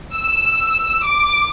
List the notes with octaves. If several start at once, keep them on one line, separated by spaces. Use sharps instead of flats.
E6
D6